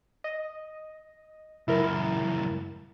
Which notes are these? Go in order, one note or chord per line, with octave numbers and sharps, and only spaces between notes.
D#5
C#2 F#2 E4 A#4